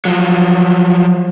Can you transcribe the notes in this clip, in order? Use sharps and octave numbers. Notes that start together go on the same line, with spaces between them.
F3 F#3